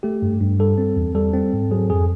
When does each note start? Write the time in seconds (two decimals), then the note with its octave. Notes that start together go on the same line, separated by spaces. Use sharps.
0.03 A3 G4
0.22 G2
0.41 G2
0.59 G3 A4
0.78 C4
0.96 E2
1.15 G3 A4
1.33 C4
1.53 G#2
1.71 F#3 G#4
1.90 F2 G#4